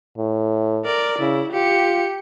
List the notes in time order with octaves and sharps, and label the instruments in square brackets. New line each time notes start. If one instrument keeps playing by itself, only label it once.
[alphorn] A2
[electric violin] A#4 D5
[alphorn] C#3 [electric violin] E4
[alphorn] F4 [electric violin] G4 C#7